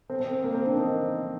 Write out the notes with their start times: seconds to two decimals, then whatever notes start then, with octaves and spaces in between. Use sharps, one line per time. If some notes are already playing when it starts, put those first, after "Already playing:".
0.10 C4
0.21 C4
0.44 A#3
0.54 C4
0.66 D4
0.77 D#4